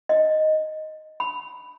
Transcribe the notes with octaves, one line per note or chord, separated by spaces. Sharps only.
D#5
B5